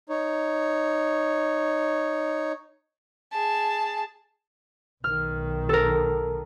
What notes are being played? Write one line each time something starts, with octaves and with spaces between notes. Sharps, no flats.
D#4 C#5
G#4 A5
B1 D#3 F6
A4 A#4